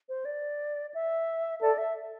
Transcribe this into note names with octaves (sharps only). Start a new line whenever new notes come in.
C5
D5
E5
A4 D5
E5